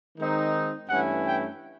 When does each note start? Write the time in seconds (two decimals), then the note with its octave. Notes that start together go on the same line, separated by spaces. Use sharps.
0.17 D#3 G#3 C4 D#4
0.89 G2 E3 A3 C#4 E4 F#5
1.25 G5